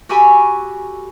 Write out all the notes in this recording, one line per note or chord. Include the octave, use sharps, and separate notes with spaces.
F#4 G4 A4 G#5 B5 C#6